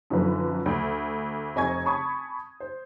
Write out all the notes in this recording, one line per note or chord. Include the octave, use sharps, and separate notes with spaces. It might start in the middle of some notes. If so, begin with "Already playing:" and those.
F#2 D3 F3 D#4 B4
D2
F1 C4 D#5 G#5 C#6 G#6
G#5 A5 B5 C#6 D#6 G#6
C5